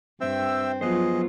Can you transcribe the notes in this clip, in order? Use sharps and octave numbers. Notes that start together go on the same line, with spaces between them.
G2 C4 E5 G5 E6
F3 F#3 B3 F4 G#4 C5 D#5